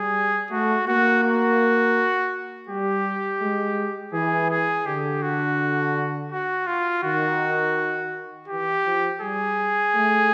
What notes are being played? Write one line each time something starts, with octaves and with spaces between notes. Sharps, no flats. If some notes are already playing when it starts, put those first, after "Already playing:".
Already playing: G3 G#4
A3 F#4
A#3 F#4
F#4
G3 G4
G#3
E3 G#4
G#4
D3 G4
F#4
F#4
F4
D#3 F#4
E3 G4
F3
G3 G#4
A3